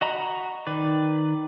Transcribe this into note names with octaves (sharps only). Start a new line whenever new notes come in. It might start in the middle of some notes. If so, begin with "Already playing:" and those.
F#4 D#5 A#5 B5
D#3 B4 D5